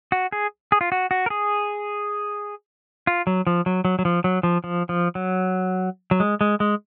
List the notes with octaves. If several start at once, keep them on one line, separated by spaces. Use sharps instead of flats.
F#4
G#4
G#4
F4
F#4
F#4
A#4
G#4
F4
F#3
F3
F#3
F#3
F#3
F3
F#3
F3
F3
F3
F#3
F#3
G#3
G#3
G#3